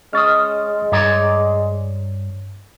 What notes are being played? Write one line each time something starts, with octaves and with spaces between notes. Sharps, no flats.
G#3 C#4 D#5 F6 A6
G2 C#5 D5 A#5